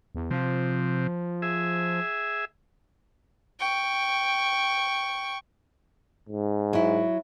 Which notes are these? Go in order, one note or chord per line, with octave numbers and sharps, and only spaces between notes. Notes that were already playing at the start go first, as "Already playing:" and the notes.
E2
C3 F3
G#4 E5
G5 C#6
G#2
F#3 E4